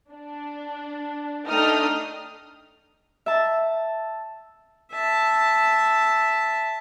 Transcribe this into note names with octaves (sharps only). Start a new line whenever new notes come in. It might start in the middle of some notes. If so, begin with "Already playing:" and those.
D4
A3 D4 D#4 G5 D#6 F6
E5 A5
E5 A5